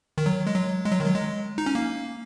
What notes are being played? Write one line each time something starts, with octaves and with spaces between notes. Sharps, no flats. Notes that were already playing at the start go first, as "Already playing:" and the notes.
D#3
F#3
G#3
F#3
G#3
F#3
D#3
F#3
G#3
D#4
C#4
A#3